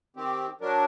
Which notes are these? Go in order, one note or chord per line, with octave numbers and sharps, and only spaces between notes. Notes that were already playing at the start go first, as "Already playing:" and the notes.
D#3 C4 G4
F#3 D4 A#4